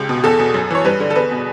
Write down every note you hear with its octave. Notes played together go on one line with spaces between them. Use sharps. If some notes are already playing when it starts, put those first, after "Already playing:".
Already playing: C#2 G4
B2
E2 A4
B2
F#2
E3 C#5
G2 B4
D3
A4
E2 B4
B2